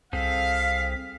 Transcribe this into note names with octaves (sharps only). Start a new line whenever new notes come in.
C2 C4 G#4 A4 F5 B6